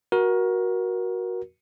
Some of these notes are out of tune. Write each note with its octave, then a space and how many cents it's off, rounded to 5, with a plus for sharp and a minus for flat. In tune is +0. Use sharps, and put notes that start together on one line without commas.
F#4 +0 A#4 +25